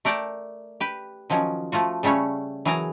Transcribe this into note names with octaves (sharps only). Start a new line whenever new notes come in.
A3 A#4 D5 G5 A5
G4 B4
D#3 F3 F#3 C#4
F3 A3 F4 F#4
C#3 G3 A3 C#4 C#5
E3 F#3 G#4 A#4 A5 A#5